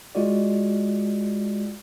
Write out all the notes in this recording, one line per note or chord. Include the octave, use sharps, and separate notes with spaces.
G#3 F4 F#4 D5